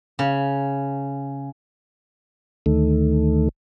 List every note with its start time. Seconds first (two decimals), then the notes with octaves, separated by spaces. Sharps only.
0.19 C#3
2.66 D2 D#3 A3